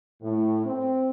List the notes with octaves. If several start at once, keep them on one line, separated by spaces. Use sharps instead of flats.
A2
C4